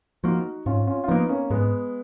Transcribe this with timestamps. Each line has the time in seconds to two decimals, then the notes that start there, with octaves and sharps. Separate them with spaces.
0.24 F3 A#3 D#4 F#4
0.66 G#2 C#4 F4
0.87 C#4 F4
1.04 F4
1.08 F3 A#3 B3 D#4
1.29 A#3 C#4
1.50 G#2 G#3 B3